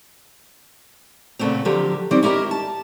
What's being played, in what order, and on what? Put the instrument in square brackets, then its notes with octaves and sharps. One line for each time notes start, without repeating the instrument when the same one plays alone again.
[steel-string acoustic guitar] A#2 C#3 A3 B3 C4
D3 F3 F#3 G4 A#4
D#3 E3 G3 C4 D5
C#4 E4 G4 A#4 D#5
A5